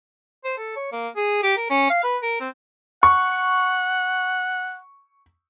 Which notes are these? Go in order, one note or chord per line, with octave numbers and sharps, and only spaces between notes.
C5
A4
C#5
A#3
G#4
G4
A#4
C#4
F5
B4
A#4
C4
F#5 C#6